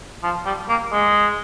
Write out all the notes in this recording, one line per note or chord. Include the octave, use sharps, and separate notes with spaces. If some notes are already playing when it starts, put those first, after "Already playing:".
F3
G3
A#3
G#3